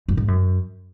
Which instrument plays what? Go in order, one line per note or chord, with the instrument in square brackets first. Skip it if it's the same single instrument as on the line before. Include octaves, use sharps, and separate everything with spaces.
[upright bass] F#2
G#2
F#2